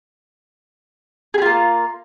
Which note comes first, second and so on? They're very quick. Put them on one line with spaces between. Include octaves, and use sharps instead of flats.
G#4 G4 F4 A#3